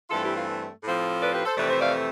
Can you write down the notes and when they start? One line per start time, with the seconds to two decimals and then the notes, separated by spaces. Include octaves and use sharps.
0.09 G2 E3 A3 C4 F4 A4
0.22 E4 G4
0.35 F4
0.84 A2 F3 C4
1.20 B4 D5
1.33 G4 B4
1.45 A4 C5
1.56 F2 C3 E3 A3 C4 B4 D5
1.69 C5 E5
1.80 D5 F5